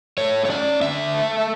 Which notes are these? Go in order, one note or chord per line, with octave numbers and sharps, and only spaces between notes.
A3 C#5
C#5
C#4 D5
D3 E5
A3